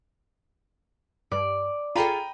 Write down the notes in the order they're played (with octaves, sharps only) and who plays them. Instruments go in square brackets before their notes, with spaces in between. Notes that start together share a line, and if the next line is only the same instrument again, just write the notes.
[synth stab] G2 [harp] D5
[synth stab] F4 G#4 A4 [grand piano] G5 A#5 B5 [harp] D#7